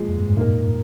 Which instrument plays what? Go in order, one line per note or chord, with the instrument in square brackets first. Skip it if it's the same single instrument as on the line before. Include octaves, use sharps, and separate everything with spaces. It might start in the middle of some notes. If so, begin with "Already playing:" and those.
Already playing: [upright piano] A#2 F3 G#3
[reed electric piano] F2
G2
G#2
[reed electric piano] A#2 [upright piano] A#3 D#4 A#4